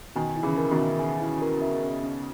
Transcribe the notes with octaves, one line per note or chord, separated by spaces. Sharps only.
B2 D#3 G#5
E4
C#3 E3
A#4
B2 D#3
E5
G#5
E4
A#4
E5
C#4
C#4